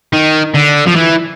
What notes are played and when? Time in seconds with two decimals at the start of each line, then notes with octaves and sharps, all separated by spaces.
0.13 D#3
0.55 D3
0.87 F3
0.96 E3